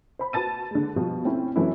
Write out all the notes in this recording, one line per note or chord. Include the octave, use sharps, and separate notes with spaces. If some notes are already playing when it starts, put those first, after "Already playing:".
C5 B5
F#4 B4 A5 A6 D#7
D3 G#3
B2 F3 G3
A3 C4 C#4 E4
F#2 C3 E3 F#3 A3 E4